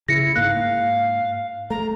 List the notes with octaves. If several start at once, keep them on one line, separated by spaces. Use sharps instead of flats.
C#3 E4 A#6 C#7
G#2 A#3 F5 F#6
A3 A#5